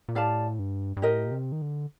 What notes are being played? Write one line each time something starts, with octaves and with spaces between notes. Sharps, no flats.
A#2
A2 G4 D5 F5 A5
G2
G2
A2 G4 A#4 D#5
A#2
C3
D#3
D3